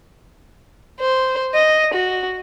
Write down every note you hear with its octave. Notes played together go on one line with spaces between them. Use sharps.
C5
D#5
F#4